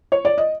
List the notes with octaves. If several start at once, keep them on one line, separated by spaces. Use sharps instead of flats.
C#5
D5
D#5